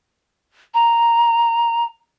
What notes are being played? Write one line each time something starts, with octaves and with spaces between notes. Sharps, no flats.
A#5